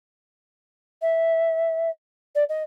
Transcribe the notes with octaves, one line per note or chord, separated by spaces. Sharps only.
E5
D5
D#5